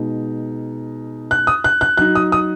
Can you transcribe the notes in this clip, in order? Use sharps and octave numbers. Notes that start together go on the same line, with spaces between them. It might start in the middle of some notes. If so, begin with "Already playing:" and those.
Already playing: B2 G#3 D#4
F#6
D#6
F#6
F#6
F#3 D#4 F#6
D#6
D#6